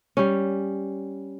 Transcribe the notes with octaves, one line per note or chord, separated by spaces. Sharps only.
G3 C#4